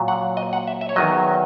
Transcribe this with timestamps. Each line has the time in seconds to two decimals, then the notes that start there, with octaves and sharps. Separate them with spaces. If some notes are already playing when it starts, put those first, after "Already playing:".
Already playing: A#2 F#3
0.08 F#5
0.37 D#5
0.53 F#5
0.67 E5
0.81 E5
0.89 C#5
0.96 E2 D#3 F#3 D#5